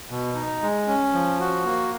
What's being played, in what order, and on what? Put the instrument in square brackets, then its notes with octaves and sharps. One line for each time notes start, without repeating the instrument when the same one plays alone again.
[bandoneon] B2
D#4
G#3
C#4
F3
F#4
A#3